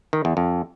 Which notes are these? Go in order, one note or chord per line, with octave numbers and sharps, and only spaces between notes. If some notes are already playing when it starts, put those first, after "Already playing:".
D#3
E2
F2